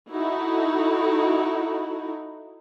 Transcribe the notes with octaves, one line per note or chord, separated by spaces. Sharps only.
D#4 E4 F#4 A4